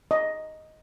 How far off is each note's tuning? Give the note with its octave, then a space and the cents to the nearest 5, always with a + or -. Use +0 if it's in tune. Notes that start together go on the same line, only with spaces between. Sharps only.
D#5 +5